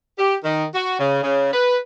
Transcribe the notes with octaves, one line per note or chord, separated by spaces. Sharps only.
G4
D#3
F#4
C#3
C#3
B4